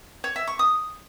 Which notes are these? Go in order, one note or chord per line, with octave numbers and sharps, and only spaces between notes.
C#5
E5
C#6
D#6